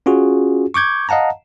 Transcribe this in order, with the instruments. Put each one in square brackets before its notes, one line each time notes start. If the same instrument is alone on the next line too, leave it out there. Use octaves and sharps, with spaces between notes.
[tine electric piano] C#4 F4 F#4 G#4
C#6 D6 G6 G#6
D#5 F5 F#5 A5 A#5